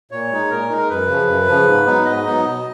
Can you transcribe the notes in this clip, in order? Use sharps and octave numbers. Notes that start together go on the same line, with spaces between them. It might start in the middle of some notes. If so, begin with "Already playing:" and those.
A#2 C#5
G#3 D#4
A#2 A#4
G#3 D#4
A#4
F#2 B4
C#3 F3
F#2
C#3 F3
G#2
F#3 B3 D#4
G#2 D#5
F#3 B3 D#4
B2